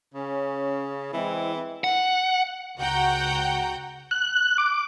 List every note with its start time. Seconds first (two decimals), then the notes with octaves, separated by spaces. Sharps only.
0.14 C#3 C#4
1.13 E3 G#3 C4 E4
1.84 F#5
2.79 C#2 F#4 F#5 G5 A#5 G6
4.11 F#6
4.58 D6